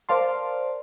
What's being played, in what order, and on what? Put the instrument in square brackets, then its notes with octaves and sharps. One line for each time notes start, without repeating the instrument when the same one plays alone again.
[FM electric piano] A#4 C5 D5 F5 A5 C6